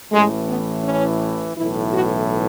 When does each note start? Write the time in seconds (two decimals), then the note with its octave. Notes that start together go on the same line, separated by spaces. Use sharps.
0.12 A1 A2 E3 G#3
0.48 B3
0.84 C#4
1.57 B1 A2 E3 E4
1.93 F#4